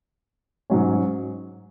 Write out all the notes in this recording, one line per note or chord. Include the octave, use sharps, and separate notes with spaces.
G#2 F#3 C#4